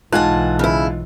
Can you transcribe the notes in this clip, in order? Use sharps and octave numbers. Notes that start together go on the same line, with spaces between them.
B1 G#2 E3 F4 F#5 G#5 A5 F#6
C#3 E4